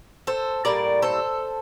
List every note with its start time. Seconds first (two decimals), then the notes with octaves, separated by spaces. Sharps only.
0.27 A4 C5
0.65 A2 G3 A#3 A#4 D5
1.02 A4 C5